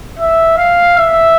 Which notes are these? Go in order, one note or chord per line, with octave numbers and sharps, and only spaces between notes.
E5
F5
E5